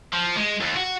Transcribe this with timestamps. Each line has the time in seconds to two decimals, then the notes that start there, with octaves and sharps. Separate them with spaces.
0.13 F3
0.37 G#3
0.61 D#2
0.76 F#4